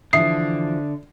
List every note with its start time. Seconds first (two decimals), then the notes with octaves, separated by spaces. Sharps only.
0.13 D3 E3 F3 E5 D#6 C7